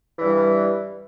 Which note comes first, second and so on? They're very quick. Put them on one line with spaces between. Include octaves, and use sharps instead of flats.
E3 G2 G3